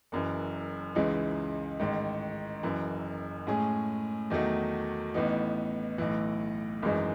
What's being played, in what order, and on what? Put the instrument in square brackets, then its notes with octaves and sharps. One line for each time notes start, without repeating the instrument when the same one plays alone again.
[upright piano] F#1 F#2 E3
C#2 C#3 E3 G#3 D#4
A1 G#2 D#3
F#1 F#2 E3
A2 G#3 C#4 G#4
E2 D#3 F#3 A3 D#4
A1 A2 E3 B3 D#4
B1 A2 E3
G#1 F#2 E3 G#3 D#4